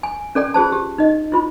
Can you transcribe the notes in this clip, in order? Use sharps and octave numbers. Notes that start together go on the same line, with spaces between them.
G#5
C#4 A4 D5 G5
F4 G#4 C5 A5
G4
D#4 D#5
E4 F4 B5